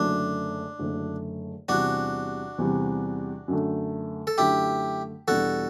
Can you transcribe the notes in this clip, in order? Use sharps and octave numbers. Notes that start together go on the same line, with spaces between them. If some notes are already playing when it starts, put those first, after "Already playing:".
Already playing: F#1 F#2 D3 A3 D4
F#1 F#2 D3 A3
E2 C3 G3 D4 F#4
E2 C3 G3
F#2 D3 A3
A4
F#2 D3 A3 E4 G4
E2 B2 G3 D4 F#4 A4